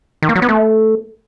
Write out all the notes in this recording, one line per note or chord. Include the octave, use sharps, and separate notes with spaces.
D#3
A#3
F#3
B3
A3